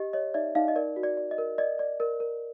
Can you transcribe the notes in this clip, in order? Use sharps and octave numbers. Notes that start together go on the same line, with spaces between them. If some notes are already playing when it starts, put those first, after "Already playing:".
Already playing: G4 D#5
C#5 D#5
D#4 D5 E5
D#4 D#5 F5
D#5
A#4 D5
F#4
D5
D5
D#5
A#4
D5 D#5
D5
A#4
A#4